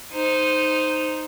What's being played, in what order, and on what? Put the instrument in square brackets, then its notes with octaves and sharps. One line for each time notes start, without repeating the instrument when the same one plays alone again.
[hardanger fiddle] D#4 C5